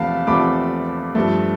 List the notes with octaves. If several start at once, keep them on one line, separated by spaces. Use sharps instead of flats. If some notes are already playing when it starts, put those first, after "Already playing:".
Already playing: E2 C3 F3 A3 F5 A5 B5
E2 C3 F3 A3 B5 D6
G2 F3 A3